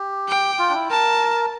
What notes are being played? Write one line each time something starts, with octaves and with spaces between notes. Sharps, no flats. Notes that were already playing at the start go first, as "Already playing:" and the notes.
Already playing: G4
G5
F4
D4
E4
A#4 A5